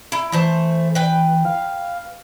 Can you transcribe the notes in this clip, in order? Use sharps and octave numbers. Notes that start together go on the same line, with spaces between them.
E4
E3 A3 C5 A5
B4 G5
F5